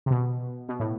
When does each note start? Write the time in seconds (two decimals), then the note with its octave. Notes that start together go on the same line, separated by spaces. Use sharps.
0.06 C3
0.11 B2
0.69 B2
0.80 A2